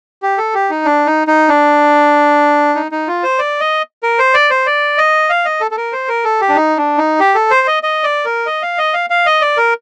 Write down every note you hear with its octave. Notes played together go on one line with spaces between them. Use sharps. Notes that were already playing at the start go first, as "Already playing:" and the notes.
G4
A4
G4
D#4
D4
D#4
D#4
D4
D#4
D#4
F4
C5
D5
D#5
A#4
C5
D5
C5
D5
D#5
F5
D#5
A4
A4
A#4
C5
A#4
A4
G4
D4
D#4
D4
D#4
G4
A4
C5
D#5
D#5
D5
A#4
D#5
F5
D#5
F5
F5
D#5
D5
A#4